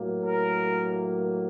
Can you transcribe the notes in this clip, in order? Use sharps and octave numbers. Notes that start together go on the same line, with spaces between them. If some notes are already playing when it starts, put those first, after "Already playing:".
Already playing: A2 F#3 A#3
A#4